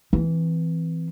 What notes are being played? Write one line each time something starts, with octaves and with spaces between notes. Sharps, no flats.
E3 C4